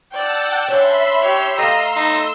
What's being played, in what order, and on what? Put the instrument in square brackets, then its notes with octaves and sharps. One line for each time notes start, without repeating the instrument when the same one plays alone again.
[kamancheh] D5 G5 [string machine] F#5 A5 E6
[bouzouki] C#4 D4 [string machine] E5 B5 C6
[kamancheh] G4 C#5 [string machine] C6 E6
[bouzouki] A3 F5 [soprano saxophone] D#5 [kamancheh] A#5
[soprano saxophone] D#4